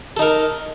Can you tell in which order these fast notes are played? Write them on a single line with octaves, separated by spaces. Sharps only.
A4 D#4 A#4